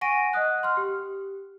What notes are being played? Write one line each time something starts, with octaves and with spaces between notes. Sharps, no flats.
F#5 G#5 C#6 A#6 D7 D#7
D#5 F#5 D#6 F#6
C6 F6
G4